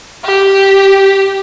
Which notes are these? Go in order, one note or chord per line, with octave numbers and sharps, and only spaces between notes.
G4